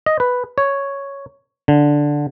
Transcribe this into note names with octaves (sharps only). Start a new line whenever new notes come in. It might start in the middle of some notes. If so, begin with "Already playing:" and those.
D#5
B4
C#5
D3